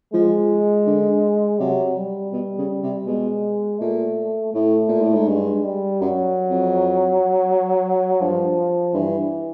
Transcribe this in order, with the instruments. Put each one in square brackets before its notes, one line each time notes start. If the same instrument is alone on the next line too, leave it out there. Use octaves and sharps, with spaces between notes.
[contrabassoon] F3 [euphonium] G#3
[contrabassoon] D3
[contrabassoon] C3 [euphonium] F#3
[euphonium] G3
[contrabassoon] B2
C#3
C3
[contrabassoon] B2 [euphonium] G#3
[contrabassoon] A#2 [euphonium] A3
[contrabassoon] A2 [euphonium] A3
[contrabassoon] A#2
A2
G#2
[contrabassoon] G2 [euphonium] G#3
[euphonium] G3
[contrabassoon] F#2 [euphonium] F#3
[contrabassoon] F2
[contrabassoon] G2 [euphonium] F3
[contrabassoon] G2 [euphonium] E3